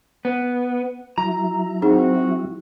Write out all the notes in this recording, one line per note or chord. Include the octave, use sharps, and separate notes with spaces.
B3
F#3 E4 A#5
C4 D#4 F#4 G#4